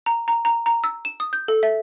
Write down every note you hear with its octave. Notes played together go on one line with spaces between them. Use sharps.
A#5
A#5
A#5
A#5
E6
E7
D#6
G6
A4
E5